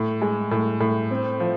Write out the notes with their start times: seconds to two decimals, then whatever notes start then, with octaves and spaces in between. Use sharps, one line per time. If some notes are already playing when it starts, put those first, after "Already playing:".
Already playing: A2
0.22 G#3
0.51 A2
0.80 A2
1.11 C4
1.40 F3